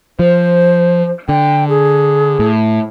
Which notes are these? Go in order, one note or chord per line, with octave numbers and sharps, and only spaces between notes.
F3 C5
D3 G5
G#4
A2